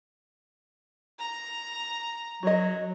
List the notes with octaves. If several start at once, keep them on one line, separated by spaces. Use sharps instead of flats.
A#5
F#3 F#4 D#5